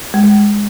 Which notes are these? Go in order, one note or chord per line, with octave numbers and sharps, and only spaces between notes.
G#3